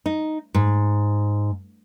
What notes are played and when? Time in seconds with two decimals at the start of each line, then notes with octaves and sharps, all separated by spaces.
0.06 D#4
0.54 G#2